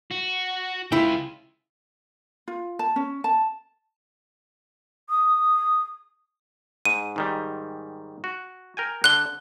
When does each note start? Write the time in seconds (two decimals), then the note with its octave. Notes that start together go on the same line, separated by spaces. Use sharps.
0.11 F#4
0.92 C#3 E4 F4 G5
2.48 F4
2.79 A5
2.96 C#4
3.24 A5
5.10 D#6
6.85 G#2 D#7
7.16 G#2 D#3 G3
8.24 F#4
8.77 A#4 G5 G#5
9.04 D3 F#6 G7